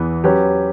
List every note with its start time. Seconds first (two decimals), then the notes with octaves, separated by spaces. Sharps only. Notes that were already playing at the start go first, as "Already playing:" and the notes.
Already playing: E2 E3 B3
0.24 F#3 C#4 G4 B4